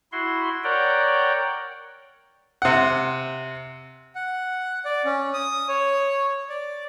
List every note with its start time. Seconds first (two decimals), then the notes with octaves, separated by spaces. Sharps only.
0.12 E4 F#4 C6
0.64 A#4 C#5 D5 F#5 G5
2.62 C3 F#5
4.15 F#5
4.85 D5
5.05 C#4
5.34 D#6
5.68 C#5
6.49 D5